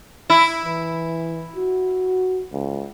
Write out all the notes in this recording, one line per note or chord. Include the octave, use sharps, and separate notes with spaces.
E4
E3
F#4
C#2